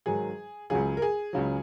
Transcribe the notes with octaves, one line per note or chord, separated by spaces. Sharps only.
G#2 D#3 F#3 G#4
C#2 C#3 F#3 G#4
A#4
G#4
C#2 C#3 F#3